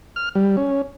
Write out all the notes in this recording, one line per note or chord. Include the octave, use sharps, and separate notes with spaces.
F6
G3
C#4